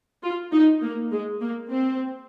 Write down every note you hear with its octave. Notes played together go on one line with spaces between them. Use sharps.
F4
D#4
A#3
G#3
A#3
C4